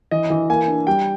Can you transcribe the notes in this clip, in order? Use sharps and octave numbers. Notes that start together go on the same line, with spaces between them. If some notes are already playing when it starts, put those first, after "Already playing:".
E3 D#5
E3
A#3 G#5
D4
G3 G5